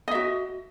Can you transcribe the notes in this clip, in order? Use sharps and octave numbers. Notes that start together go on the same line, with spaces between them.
F#4 D#5 E5